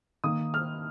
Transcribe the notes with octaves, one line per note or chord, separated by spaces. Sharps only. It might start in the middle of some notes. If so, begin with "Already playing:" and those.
D#3 A#3 D#6
F6